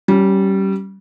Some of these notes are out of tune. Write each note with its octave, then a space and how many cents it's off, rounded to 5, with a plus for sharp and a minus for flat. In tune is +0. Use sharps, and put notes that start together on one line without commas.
G3 -20 C#4 +0